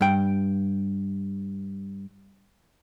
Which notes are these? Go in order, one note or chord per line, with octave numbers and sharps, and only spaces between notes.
G2 G5